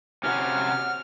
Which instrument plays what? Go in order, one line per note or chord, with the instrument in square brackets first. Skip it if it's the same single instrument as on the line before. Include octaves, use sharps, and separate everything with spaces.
[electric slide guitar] C3 C#4 [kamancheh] F#4 [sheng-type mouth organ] F6